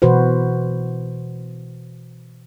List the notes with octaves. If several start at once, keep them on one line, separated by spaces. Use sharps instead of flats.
B2 E3 F#4 B4 C5